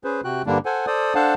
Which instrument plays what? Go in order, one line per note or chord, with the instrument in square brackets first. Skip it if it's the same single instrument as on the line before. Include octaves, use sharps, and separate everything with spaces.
[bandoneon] C#4 G#4 B4 C5
C3 F#4 G5 F#6
G2 D3 G3 A#3 D4
A4 C5 F#5 G#5
A4 C5 D5 D#6
D4 A4 C5 F5 F#5 A5